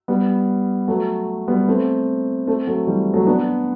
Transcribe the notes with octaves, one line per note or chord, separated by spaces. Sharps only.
G3 B3
F#3 A3
G3 B3
A3 C4
A3 C4
F#3 A3
E3 G3
F#3 A3
B3 D4